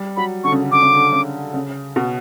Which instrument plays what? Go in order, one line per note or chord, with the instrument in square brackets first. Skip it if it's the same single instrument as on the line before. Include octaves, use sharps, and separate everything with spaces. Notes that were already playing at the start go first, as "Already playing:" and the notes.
Already playing: [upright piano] G3
[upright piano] F#3 [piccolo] B5
[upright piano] D3 [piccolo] C#6
[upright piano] C#3
D3
[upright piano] D3 [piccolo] D6
[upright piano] C#3
D3
C#3
C#3
B2